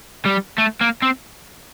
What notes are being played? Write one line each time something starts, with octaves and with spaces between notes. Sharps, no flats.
G3
A3
A#3
C4